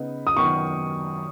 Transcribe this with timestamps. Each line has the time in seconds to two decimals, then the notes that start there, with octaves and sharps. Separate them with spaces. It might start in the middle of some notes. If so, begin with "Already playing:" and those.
Already playing: C#3 B3 D#4 B4
0.27 D#6
0.37 F#2 D#3 B3 F#4 C#6